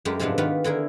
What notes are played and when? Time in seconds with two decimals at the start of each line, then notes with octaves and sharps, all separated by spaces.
0.05 F#2 G#3 A3 G4 A#4
0.19 G#2 C3 F3 G#3 B3 D4
0.38 D#3 B3 F4 G4 B4
0.64 D3 E4 G#4 A#4